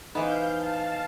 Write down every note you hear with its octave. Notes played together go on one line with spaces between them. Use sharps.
E3 B3 D#4 C5 F5 G6
F5 A5